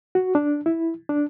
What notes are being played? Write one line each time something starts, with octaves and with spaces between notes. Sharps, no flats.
F#4
D4
E4
D4